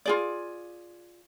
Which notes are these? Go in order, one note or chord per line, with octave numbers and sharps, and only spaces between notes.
F4 G#4 D5